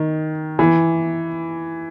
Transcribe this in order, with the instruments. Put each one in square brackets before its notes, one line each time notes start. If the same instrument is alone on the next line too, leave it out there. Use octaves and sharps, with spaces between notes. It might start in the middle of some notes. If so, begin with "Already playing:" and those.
Already playing: [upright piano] D#3
E3